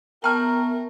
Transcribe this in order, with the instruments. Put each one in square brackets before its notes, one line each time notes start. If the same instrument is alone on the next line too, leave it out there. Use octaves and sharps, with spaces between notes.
[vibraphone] B3 E5 C#6 [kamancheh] A#4 [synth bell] G5 A5 [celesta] A#5 F6